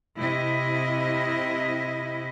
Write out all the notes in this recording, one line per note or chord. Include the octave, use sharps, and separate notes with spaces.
C3 E4 D#5